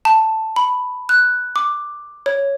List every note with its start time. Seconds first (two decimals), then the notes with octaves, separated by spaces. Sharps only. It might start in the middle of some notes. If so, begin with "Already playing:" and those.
0.05 A5
0.56 B5
1.09 F#6
1.56 D6
2.26 C#5